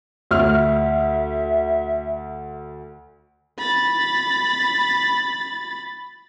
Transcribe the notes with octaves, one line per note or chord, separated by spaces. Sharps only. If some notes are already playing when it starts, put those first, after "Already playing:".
D2 E5 F6
B5 A6